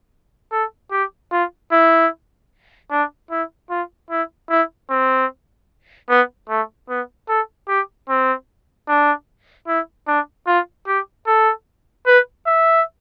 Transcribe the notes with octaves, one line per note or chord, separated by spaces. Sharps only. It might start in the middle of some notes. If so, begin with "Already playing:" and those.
A4
G4
F4
E4
D4
E4
F4
E4
E4
C4
B3
A3
B3
A4
G4
C4
D4
E4
D4
F4
G4
A4
B4
E5